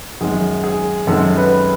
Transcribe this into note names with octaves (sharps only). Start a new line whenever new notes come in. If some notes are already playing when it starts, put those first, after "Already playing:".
F#2 D#3 G#3 G#4
G#4
F#2 D#3 G#3 A4
B4